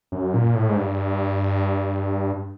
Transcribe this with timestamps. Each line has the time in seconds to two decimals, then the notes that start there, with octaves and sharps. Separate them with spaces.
0.12 F#2
0.34 A#2
0.55 A2
0.69 G#2
0.76 G2